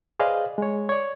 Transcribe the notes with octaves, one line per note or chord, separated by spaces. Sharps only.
G#4 B4 C5 D5 D#5 F5
G#3 C#5
C#5 D5